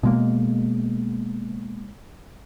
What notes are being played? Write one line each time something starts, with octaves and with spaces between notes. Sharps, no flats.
B2 G#3 A#3